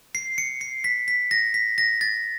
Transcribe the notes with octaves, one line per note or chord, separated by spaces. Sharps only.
C7
C#7
C7
B6
B6
A#6
B6
A#6
A6